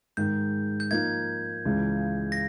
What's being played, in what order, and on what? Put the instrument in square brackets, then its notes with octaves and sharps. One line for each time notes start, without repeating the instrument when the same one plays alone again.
[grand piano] G#2 D#3 G#3 [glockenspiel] G6
[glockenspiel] G6
[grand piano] F3 A#3 D#4 [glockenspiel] G#6
[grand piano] C#2 C#3 E3 G#3
[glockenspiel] A#6